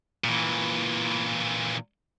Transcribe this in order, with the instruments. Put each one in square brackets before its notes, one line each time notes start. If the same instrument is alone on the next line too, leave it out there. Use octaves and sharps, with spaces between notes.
[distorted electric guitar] A#2 E3